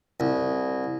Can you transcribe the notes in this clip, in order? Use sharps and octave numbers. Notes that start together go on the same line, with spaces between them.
C2